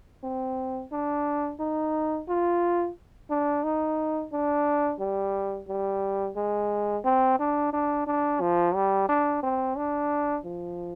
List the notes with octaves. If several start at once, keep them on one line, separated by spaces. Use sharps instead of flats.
C4
D4
D#4
F4
D4
D#4
D4
G3
G3
G#3
C4
D4
D4
D4
F3
G3
D4
C4
D4
F3